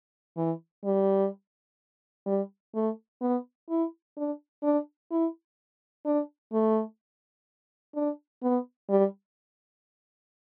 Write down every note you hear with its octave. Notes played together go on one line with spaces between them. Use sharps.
E3
G3
G3
A3
B3
E4
D4
D4
E4
D4
A3
D4
B3
G3